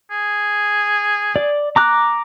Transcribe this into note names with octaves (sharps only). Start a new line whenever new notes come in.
G#4
D5
A#5 D6 F#6